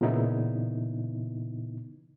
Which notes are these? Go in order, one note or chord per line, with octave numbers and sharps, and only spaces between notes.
A#2 C#3 E3 B3 D#4 E4